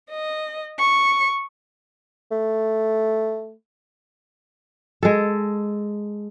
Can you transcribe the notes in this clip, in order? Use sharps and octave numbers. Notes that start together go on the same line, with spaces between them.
D#5
C#6
A3
G#3 A4